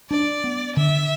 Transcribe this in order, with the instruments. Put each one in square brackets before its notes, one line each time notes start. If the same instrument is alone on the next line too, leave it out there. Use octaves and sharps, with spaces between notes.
[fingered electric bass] D4 [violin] D5
[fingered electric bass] B3
[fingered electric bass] D3 [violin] E5